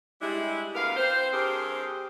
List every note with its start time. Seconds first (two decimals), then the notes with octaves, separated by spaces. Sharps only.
0.21 G3 G#3 D4 E4
0.74 D2 B3 A#4 F5
0.96 C4 C5
1.31 G2 C4 G4 G#4 A#4